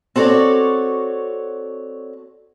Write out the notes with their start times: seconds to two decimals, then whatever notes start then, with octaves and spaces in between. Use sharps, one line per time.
0.16 C4 F#4 A4 C#5 D5